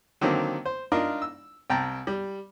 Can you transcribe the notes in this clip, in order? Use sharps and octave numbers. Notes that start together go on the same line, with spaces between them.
D3 D#3 F#3 A#3 C4
C5
D4 D#4 F4 A#4
E6
C2 G5 A5 A#5
G3